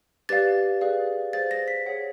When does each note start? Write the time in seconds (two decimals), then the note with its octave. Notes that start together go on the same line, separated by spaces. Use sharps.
0.29 G4 B4 D5 F5 A6
0.81 G#4 B4 D5 F5
1.33 G#4 C5 F5 A6
1.51 A#6
1.68 B6
1.86 G#4 C#5 F#5